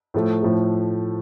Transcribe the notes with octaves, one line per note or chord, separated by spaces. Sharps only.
A2 F3 A3
A2 F3 A3